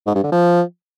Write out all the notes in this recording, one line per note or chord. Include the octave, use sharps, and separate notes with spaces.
G#2
G2
D3
F3